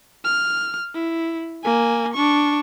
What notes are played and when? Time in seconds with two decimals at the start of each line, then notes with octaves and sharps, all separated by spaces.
0.24 F6
0.94 E4
1.64 A#3 G#5
2.14 D4 C#6